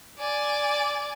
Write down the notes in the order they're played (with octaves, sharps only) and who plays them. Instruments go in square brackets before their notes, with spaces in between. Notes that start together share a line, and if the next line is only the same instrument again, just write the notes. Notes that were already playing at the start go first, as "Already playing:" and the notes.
[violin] D5 G#5